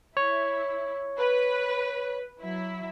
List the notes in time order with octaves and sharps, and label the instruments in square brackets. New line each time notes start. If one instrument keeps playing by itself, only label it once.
[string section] E4 [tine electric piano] C#5
[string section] B4
F#3 E4